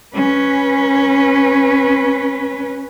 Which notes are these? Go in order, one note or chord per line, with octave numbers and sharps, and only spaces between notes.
C#4 B4